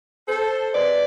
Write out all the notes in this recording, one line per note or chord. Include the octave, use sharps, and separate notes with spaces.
A4 C5
C3 G#3 C4 B4 D5